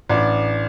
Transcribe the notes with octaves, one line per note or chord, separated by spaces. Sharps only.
A1 D4 D5